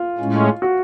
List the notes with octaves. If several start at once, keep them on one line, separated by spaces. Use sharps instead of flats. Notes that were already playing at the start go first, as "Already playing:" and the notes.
Already playing: F4
A2 G#3 C#4
F#4